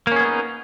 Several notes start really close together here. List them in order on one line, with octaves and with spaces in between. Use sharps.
A#3 C#4 G#4 B3 D#4